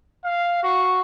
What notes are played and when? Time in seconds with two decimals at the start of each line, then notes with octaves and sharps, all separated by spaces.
0.24 F5
0.63 F#4